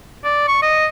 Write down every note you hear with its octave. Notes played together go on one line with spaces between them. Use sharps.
D5
C#6
D#5